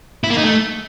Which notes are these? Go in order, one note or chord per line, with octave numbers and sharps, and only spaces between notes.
E4
A#3
D#4
A3